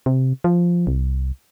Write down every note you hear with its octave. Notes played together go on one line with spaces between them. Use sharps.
C3
F3
C2